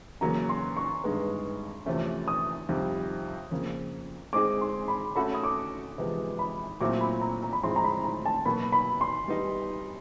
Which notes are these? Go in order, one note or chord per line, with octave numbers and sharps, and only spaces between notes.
E2 C#3 F#3 A#3 C#4 A#5
C6
C#6
G2 D#3 G#3 B3
E2 C3 F3 A3 C#4
D#6
F2 C3 D#3 G3
F2 C#3 F3 A#3
G#3 C4 D#4 G#4 D6
C6
B5
A3 C#4 F#4 A4 B5
D#6
D6
E2 C3 F3 G#3 B3
B5
A#2 F#3 A3 C4 E4 D6
B5
A#5
A#5
B5
A2 F3 G#3 C4 C6
A#5
B5
A#5
A5
B2 F#3 A#3 B5
B5
C6
G3 B3 D#4